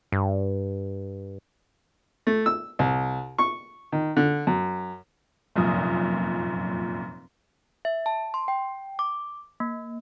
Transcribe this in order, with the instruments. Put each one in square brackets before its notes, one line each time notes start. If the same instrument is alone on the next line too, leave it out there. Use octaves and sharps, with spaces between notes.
[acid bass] G2
[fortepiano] A3
E6
C2
C#6
D#3
D3
F#2
[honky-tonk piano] F1 F#2 A#2 D#6
[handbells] E5
A5
C6
G5
D6
A#3